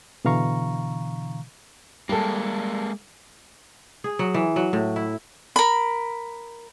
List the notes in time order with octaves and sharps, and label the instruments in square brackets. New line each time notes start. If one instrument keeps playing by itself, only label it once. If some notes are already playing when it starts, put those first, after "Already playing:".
[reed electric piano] B2 D3 E3 F5 A#5 C#6
[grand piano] G3 A4 [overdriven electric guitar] G#3 A#3
[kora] G#4
F#3
E3
F#3
A2
E4
[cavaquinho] A#4 B5